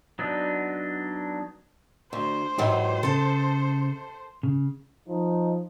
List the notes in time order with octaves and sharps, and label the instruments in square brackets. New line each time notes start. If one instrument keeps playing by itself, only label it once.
[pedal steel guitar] F#3 B3 D4 D#4
[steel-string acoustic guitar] D2 [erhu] C5
[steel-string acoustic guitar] G#2 E3 F#3 [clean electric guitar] G4
[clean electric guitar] C#3 [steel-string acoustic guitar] A4 A5
[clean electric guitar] C#3
[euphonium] F3 [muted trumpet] D#4